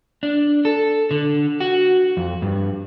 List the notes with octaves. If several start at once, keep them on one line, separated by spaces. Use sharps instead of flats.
D4
A4
D3
F#4
F2
G2